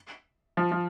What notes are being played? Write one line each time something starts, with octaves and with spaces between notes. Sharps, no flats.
F3
F3